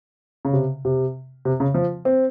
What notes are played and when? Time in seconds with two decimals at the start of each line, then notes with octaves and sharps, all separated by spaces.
0.45 C#3
0.53 C3
0.85 C3
1.45 C3
1.60 C#3
1.74 F3
2.05 C4